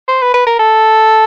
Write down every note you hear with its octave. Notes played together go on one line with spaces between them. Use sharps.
C5
B4
B4
A#4
A4